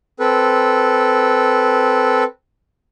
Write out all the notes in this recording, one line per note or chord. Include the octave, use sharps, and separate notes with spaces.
C4 A4 B4